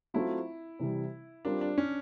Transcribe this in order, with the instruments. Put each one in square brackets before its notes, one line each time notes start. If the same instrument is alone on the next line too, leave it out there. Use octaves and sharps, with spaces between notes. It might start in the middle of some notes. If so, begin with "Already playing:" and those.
[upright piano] F#3 A3 C4 F4 [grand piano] E4
[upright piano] C3 E3 G3
[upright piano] G3 C4 F4 A#4 D5 [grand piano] D4
[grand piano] D4
C#4